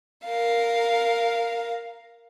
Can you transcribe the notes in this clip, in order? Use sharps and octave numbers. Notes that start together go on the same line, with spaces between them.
A#4 F5